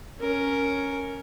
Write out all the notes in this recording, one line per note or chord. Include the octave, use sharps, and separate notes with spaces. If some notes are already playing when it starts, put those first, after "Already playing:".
C#4 A#4